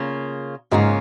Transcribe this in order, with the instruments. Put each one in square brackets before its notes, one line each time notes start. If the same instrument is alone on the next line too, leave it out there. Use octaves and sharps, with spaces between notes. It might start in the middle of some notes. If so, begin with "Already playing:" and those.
Already playing: [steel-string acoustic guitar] C#3 A#3 F4
[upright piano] G#2 [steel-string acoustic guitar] C#3 A#3 C#4 F4